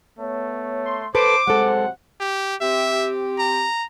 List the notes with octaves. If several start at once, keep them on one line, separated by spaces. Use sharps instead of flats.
A3 B3 C#5
C6
A4 B4 C5 D6
C3 F#3 G#3 A4 C5 F#5
G4
C4 G4 E5
A#5